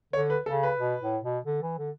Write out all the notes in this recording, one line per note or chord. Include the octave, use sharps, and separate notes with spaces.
D3 C#5
B4
C#3 A4
B4
B2
A2
B2
D3
E3
D3